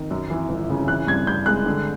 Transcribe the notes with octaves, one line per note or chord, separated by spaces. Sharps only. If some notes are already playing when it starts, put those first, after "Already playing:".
Already playing: D#3
F#2
E3
G1
C#3
E3 F#6
G2 G#6
G2 G6
G#3 F#6
D3